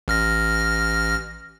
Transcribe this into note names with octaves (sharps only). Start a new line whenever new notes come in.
A1 F6 A#6